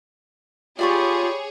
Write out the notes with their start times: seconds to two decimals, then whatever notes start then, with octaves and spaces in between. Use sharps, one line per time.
0.79 F4 G4 G#4 C#5 D5 B5 C#6